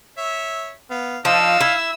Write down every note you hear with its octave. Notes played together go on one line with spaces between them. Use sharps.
C#5 E5
B3 F5
F3 D4 D#4 D#5 F5 E6
E4